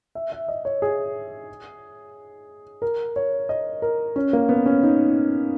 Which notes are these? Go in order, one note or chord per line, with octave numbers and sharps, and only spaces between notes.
E5
E5
D#5
C#5
G#4
A#4
C#5
D#5
A#4
C#4
A#3
B3
C#4
D#4